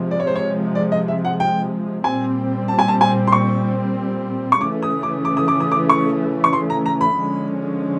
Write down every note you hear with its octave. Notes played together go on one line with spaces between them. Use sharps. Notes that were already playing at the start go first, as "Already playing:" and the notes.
Already playing: C3 F3 G#3
D5
C#5
C5
C#5
D5
D#5
E5
F#5
G5
A#2 G3 C4 G#5
A5
G#5
A5
G#5
C6
C#6
C#6
C#3 E3 A3 C#4 D6
D#6
D6
D6
D#6
D6
D#6
D6
C#6
C#6
C6
A#5
A#5
B5
D3 F3 G#3 C#4